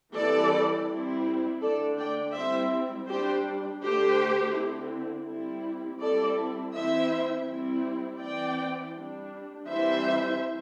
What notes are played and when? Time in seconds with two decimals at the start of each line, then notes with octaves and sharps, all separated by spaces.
0.15 E3 G3 C4 E4 A4 D5
0.89 G3 C4 E4
1.62 D3 A3 D4 A4 D5
1.99 D5 G5
2.35 G3 C4 E4 C5 E5
3.08 G3 D4 G4 C5
3.82 D3 A3 D4 G4 C5
4.56 D3 C4 E4
5.29 G3 C4 E4
6.02 G3 C4 E4 A4 D5
6.75 E3 C4 E4 C5 E5
7.49 G3 C4 E4
8.22 E3 C4 E4 D5 G5
8.96 G3 D4
9.69 E3 G3 C4 E4 C5 E5